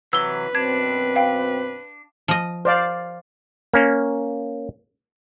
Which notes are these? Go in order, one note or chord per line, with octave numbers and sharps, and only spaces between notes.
C3 E3 F#3 B4 E6 G7
F#2 B2 C4 D4 G#6
F5 G5
F3 D#5
C5 D5 F5
A#3 C#4